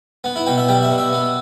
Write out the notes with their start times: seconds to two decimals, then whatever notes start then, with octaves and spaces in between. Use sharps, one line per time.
0.24 B3
0.36 E4
0.46 B2 G5
0.58 E5
0.68 G3 G5
0.83 E5
0.90 B2
0.98 E5
1.12 B3